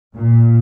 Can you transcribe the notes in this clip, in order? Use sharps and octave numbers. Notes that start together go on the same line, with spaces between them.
A#2